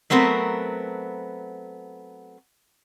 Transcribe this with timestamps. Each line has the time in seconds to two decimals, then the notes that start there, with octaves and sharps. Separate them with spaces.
0.10 F#3 A3 B3 C4 A#4